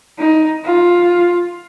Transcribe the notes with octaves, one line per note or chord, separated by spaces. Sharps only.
D#4
F4